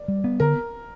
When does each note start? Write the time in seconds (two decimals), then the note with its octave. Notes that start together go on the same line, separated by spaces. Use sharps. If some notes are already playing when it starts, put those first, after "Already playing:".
Already playing: D5
0.08 G3
0.24 B3
0.40 D3 A#4